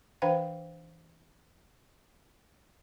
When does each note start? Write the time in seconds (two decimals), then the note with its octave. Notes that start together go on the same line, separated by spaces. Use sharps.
0.22 E3 D4 B4 C5 F5 G5